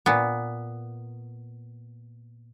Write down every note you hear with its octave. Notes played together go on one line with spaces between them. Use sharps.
A#2 B3